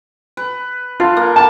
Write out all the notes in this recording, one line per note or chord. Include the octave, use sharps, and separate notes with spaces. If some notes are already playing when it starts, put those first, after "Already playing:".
B4
F4 A4
A#3
A5